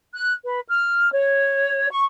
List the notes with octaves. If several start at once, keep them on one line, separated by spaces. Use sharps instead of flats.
F#6
B4
F6
C#5
C#6